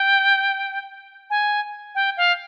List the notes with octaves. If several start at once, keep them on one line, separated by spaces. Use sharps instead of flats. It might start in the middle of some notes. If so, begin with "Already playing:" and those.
Already playing: G5
G#5
G5
F5